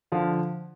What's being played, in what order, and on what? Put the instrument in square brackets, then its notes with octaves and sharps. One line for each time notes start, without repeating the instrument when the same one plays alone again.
[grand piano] D3 F3 F5